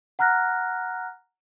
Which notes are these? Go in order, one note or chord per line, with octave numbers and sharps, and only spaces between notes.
F#5 A#5 F6 F#6 A#6